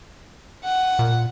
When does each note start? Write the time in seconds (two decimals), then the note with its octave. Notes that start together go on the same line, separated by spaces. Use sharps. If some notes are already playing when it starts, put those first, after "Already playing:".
0.64 F#5
0.99 A#2